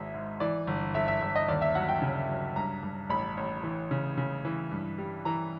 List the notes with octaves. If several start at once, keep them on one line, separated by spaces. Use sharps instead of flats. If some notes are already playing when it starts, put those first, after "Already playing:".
Already playing: G#1 G#3 E5
G#2
E3 D5
G1
G1 E5
E5
G1
D#5
D#2 D5
E5
F#3 F#5
G5
C#3
F#3
G2 A#5
G2
A1 B5
A1
E3
C#3
C#3
E3
G2
G3
E3 A#5